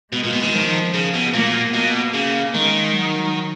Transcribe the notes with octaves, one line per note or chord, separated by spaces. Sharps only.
B2 G#3
A#2
B2
D#3
F3
C#3
B2
A#2 A#3
B2 A#3
C#3
D#3 G#3
F#3